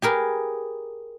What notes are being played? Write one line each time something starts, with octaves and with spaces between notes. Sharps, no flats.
G4 G#4 A#4 B4